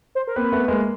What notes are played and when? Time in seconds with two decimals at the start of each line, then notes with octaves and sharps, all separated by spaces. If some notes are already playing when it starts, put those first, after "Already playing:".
0.15 C5
0.27 A#4
0.36 A#3 C4 B4
0.52 A3 B3
0.68 G#3 A#3